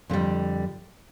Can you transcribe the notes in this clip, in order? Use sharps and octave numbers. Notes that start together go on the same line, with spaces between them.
F2 D3 G3